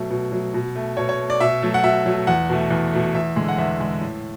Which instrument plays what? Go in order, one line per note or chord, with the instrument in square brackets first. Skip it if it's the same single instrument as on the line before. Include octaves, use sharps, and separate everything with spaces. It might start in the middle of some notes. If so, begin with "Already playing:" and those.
Already playing: [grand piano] B2 F#3 A3
B2
F#3 A3
B2
A3
B2 C#5
C#5
A3
D5
B2 E5
F#3 A3
F#5
B2 E5
F#3 A3
E2 F#5
B2 A3
E2
B2 A3
E2 E5
D3 G#3
F#5
E2 E5
D3 G#3
A2